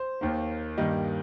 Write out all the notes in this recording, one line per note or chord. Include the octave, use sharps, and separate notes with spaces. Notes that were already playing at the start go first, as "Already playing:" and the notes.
Already playing: C5
D#2 D#3 A#3
G2 D#3 G3 A#3 D#5